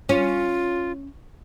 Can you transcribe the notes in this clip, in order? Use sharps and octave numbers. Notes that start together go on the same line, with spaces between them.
C#4 F4